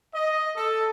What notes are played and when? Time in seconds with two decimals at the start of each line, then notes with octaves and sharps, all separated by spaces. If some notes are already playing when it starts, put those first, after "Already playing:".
0.15 D#5
0.56 A4